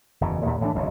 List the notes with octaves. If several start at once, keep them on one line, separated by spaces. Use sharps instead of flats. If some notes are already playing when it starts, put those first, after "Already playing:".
F#1 E2 C#3
D#2 A#2
A2 E3 A3 D4
D1 B1 F#2 C#3